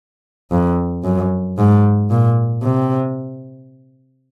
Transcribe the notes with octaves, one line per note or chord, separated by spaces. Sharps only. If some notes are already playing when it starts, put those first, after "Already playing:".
F2
F#2
G#2
A#2
C3